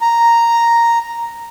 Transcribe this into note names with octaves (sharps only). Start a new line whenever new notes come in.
A#5